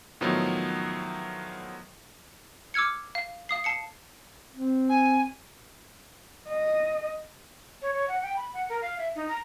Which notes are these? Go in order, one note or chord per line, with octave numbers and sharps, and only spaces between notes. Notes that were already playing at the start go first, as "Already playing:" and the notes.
A2 D#3 F3 F#3 B3
D6 E6 F6 G#6 C#7
F5
F5 D#6 C7
A5 C7 C#7
C4
G#5
D#5
C#5
C#5
F#5
G5
B5
F#5
A#4
F5
E5
D#4
A#5